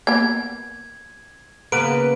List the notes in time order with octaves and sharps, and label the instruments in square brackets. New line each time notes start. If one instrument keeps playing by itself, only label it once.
[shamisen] A#3 B3 [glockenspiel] G#6
[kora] C#3 A#3 B3 [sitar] B4 [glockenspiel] D7